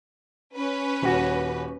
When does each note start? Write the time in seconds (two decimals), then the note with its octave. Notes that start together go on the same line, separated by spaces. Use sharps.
0.55 C#4 B4
1.02 D#1 F#4